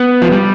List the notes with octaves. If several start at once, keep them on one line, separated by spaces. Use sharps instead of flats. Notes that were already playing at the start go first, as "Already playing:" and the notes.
Already playing: B3
F3
G3